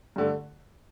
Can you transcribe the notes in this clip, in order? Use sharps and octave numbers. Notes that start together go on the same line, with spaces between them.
G2 D3 A3